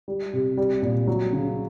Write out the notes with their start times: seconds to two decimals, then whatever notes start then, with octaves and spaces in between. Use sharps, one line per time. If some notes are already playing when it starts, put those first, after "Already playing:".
0.08 G3
0.33 C3
0.57 G3
0.82 A#2
1.07 F#3
1.33 C#3